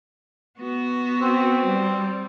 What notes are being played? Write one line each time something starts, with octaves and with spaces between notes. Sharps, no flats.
B3 F#4
C4
G3